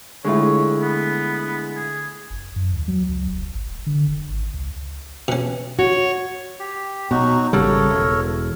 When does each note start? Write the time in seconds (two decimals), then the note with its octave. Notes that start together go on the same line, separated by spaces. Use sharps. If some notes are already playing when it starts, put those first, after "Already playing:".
0.25 D3 G#3 A3 E4 F4 C#5
0.82 B3
1.76 G#4
2.30 F#1
2.56 F#2
2.73 D2
2.88 F#3
3.09 C#2
3.27 E1
3.53 G1
3.67 D1
3.86 D3
4.07 F1
4.27 G#1
4.54 C#2
5.28 B2 C#4
5.79 F#4 C#5
6.59 G4
7.11 B2 F#3 D#4 F#4
7.53 G#1 C#3 G3 A4 A#4 C#5
7.90 E1